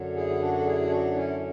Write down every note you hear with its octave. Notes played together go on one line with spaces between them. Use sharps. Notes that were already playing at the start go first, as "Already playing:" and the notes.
Already playing: F#2 D3 F#3
E4 G#4
E4
D4 F#4
A4
E4 G#4
E4
D4 F#4
C#4 E4